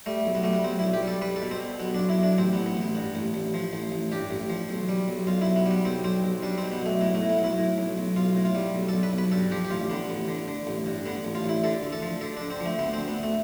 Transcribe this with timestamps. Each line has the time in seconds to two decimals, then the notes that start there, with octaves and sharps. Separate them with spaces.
0.06 G3 A3
0.25 B1
0.35 B3
0.44 G3 A3
0.53 B3
0.64 B1 C4
0.79 B1 E4
0.93 G4
1.03 G3 A4
1.22 G3 B4
1.36 A4
1.42 B2
1.51 C4
1.60 B2
1.80 B1 B3
1.94 B1 D4
2.09 E4
2.18 B1
2.23 D4
2.38 A1 C4
2.53 A1 B3
2.66 B3
2.77 A1 B3
2.95 G2
3.15 A1
3.34 A1
3.54 F3
3.73 A1
3.92 A1
4.12 G2 G4
4.31 A1
4.49 F3
4.69 B1
4.89 G3
5.08 B1
5.27 B1 F4
5.42 B1 E4
5.56 B3
5.66 G3
5.71 B3
5.85 B1 C4
6.04 B1 C4
6.24 B1
6.43 G3 D4
6.58 B2 C4
6.72 B3
6.81 B1 A3
7.01 A2 B3
7.15 A3
7.21 A2
7.30 B3
7.39 B1
7.44 E4
7.58 A2
7.78 B1
7.98 B1
8.16 B1 F4
8.35 A2
8.45 F4
8.55 G3
8.75 B1
8.89 B1 A4
9.03 B4
9.13 B1
9.18 B4
9.32 G2 A4
9.52 F3 G4
9.65 G4
9.71 A1 F4
9.90 D3 B3
10.10 A1
10.28 D3
10.48 D3
10.67 A1
10.86 G2
11.06 D3 B3
11.25 A1
11.35 F4
11.44 A1
11.49 E4
11.64 D3 A4
11.83 D2
11.92 A4
12.03 F3
12.21 D3 A4
12.37 D3 D4
12.50 C4
12.60 F3
12.66 A3
12.79 D2 B3
12.93 C4
12.98 D2
13.08 B3
13.17 D2
13.23 A3